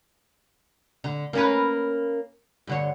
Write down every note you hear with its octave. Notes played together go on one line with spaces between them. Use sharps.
D3
A#3 C#4 B4
G2 D3 C#5